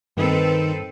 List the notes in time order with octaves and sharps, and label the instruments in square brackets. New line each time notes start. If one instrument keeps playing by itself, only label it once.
[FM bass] G2 [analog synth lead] D#3 [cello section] C4 A4 B4